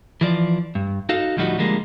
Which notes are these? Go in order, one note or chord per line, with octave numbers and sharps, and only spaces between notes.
E3 F3 D5
G2
D#4 F#4 A4 F5
D2 A2 F3 G3 D#4 F#4
D3 F3 G3 G#3 A#3